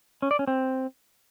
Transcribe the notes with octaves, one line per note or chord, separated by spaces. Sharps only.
C#4
D5
C#4
C4